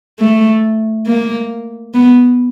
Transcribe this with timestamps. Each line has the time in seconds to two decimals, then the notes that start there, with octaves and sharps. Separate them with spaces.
0.19 A3
1.07 A#3
1.94 B3